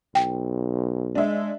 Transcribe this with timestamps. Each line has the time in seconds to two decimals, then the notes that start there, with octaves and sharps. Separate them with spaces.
0.15 B1 G5
1.15 G#3 D4 E5